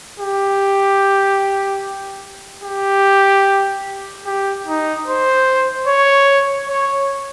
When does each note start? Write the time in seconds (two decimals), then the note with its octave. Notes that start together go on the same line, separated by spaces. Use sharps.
0.20 G4
2.64 G4
4.26 G4
4.67 D#4
5.06 C5
5.87 C#5
6.69 C#5